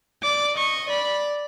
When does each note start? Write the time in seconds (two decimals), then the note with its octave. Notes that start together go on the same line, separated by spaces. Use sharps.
0.23 D5 D6
0.57 D#5 C#6
0.90 D5 B5